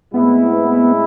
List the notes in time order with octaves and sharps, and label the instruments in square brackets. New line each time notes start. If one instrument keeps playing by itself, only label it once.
[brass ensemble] A2 G#3 C4 E4 [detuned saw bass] B3